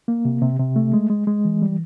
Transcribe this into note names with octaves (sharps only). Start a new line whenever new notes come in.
A#3
C3
C3
C3
A3
G#3
G#3
G#3
E3
G3